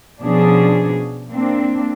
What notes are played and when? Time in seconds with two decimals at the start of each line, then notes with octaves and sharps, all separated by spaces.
0.21 B2 F3 C#4 D4 G#4
1.30 A#3 C4 D4